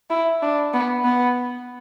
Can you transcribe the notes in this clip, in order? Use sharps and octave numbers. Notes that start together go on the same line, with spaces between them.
E4
D4
B3
B3